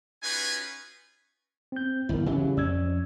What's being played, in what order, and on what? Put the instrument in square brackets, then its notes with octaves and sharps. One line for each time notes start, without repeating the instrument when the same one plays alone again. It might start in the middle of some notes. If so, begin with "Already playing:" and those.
[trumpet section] C#4 D#4 F4 F#4 B4 G#5
[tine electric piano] C4 G6
[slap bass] G1 E2 [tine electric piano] E4 A#4
[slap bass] C#3 E3 F#3 [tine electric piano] C#4 G4 E5
[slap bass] F2 C#4 [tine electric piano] D5 E6 G#6